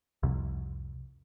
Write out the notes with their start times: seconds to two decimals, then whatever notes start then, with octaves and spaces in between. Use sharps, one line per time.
0.23 C2 F2 C3